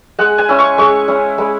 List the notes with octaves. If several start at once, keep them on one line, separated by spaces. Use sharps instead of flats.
G#3 F#5
G#5
C#4 E4
C#6
G#3 C#6
C#4 E4
G#3 B5